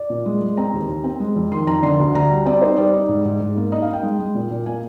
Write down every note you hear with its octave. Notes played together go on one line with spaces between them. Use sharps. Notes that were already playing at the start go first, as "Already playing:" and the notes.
Already playing: D5
A#2
G#3
G#3
C4 A#5
D#2
D#2
C4
G#3
F2
D#3 C6
F2 A#5
D3 C6
D2
D2 A#5
G3
C4 D5
D#4 C5
G3 D5
D#4
G#2
G#2
G#2
A#3
D#4 D#5
F5
D#4
G5
G#3
G#3
A#2
A#2
A#3 G#5